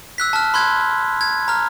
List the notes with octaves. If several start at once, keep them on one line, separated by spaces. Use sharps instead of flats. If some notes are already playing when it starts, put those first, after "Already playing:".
E6 F#6 B6
A5 F6
B5 C6 F#6 G#6
G#6
A#5 F6